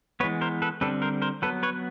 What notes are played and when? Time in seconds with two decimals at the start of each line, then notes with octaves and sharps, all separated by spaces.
0.20 E3 G#3 B3 B4 C#5
0.41 A#4 C5
0.62 A4 B4
0.81 D3 G3 C4 A4 B4
1.02 A#4 C5
1.22 A#4 C5
1.42 F#3 B3 A4 B4
1.63 B4 C#5